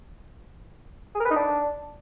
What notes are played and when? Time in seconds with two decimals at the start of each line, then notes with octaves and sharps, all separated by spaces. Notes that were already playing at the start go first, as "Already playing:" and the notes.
1.15 G#4
1.20 A#4
1.25 B4
1.31 D#4
1.36 D4